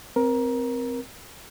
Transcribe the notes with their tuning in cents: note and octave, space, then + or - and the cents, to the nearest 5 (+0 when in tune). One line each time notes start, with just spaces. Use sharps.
C4 -10 A#4 +20